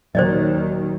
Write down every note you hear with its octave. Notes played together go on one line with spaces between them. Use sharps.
D#2 A#2 D#3 F#3 C5 D5 D#5